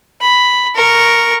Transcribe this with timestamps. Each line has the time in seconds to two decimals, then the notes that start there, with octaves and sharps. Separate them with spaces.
0.21 B5
0.75 A#4 C#6